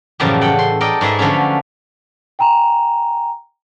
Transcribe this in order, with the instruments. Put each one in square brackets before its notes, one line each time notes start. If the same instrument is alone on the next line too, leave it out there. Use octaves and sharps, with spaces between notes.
[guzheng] F#2 A2 C#3 E3 F3 G3
A4 F#5 G5
C6
A4 A#4 D5 D#5 G5
G#2 G#3 G#4 B4 E5
D3 F3 F#3 A3 C#4
[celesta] G5 G#5 A#5